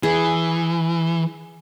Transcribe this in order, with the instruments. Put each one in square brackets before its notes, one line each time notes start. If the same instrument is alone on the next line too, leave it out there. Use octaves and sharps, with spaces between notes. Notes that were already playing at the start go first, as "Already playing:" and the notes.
[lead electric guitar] E3 [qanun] G#4